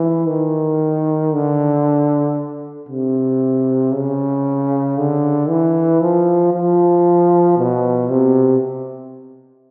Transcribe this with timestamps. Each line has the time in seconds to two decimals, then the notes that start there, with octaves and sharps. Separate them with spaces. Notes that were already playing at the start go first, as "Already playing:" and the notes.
Already playing: E3
0.28 D#3
1.33 D3
2.89 C3
3.93 C#3
4.98 D3
5.49 E3
6.01 F3
6.54 F3
7.58 B2
8.10 C3